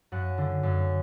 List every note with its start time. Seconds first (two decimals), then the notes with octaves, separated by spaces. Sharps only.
0.12 F#2 F#5
0.38 D3
0.63 F#2